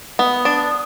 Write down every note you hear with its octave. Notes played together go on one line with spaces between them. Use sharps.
B3 D#6
D4